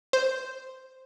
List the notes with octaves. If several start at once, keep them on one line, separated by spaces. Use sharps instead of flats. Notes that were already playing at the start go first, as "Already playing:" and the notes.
C5